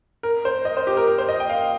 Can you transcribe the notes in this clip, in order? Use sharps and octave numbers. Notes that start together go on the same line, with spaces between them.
A#4
C5
D#5
C5
G4
A#4
A#4
C5
D#5
G5
F5